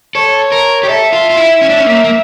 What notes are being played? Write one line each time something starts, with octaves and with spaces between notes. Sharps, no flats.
A4 C#5
A#4
G4
A4 E5
F4
F4
E4
C#4
D4
C#4
A#3
A#3